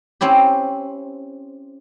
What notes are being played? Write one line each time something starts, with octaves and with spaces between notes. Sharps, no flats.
C4 C#4 E4 G4